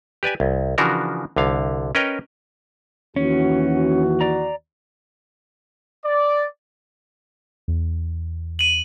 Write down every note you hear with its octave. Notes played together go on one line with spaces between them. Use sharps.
G4 B4 D5 G#5
C2
C#3 E3 F3 D4 F#4 A#4
C2 D3 F5
C#4 A#4 B4 C#5 D#5 G5
D#2 E3 C#4 F#4
D5 A#5
D5
E2
D#7 F#7